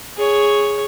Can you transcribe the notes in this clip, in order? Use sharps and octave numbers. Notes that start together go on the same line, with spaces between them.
G#4 C#5